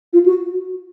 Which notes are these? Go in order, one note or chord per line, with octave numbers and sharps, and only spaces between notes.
F4
F#4